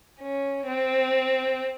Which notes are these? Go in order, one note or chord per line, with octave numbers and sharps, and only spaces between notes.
C#4
C4